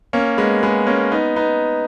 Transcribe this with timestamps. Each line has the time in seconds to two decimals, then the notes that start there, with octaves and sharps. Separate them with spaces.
0.13 A#3 C#4
0.38 G#3 B3
0.63 G#3 B3
0.87 A#3 C#4
1.11 B3 D#4
1.36 B3 D#4